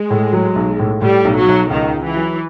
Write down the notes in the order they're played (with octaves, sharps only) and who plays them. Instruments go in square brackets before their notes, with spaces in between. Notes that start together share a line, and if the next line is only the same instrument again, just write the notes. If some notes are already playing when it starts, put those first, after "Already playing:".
Already playing: [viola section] G#3
[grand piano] A2
F#3
B1
A2
[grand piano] A2 [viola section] G3
[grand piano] B1
[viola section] F#3
[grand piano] B1
[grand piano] C#2 [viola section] D#3
[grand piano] C#2
[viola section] E3
[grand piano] F#3